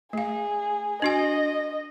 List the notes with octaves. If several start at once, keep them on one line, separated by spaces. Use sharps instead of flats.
A3 G#4 F5
D4 F#4 D#5 G#5